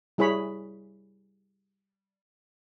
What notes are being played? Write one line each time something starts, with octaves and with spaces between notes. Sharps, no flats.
G3 E4 G#4 C#5 B5